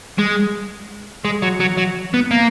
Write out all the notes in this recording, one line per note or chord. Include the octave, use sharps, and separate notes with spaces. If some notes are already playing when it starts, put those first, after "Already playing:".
G#3
G#3
F#3
F#3
F#3
B3
A#3